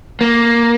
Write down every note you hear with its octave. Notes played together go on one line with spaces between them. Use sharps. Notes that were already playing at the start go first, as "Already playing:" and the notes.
A#3